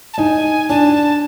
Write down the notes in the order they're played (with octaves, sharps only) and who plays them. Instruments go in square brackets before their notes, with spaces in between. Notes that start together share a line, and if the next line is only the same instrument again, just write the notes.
[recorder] A5
[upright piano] D#4 [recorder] G#5
[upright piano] D4 [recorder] A5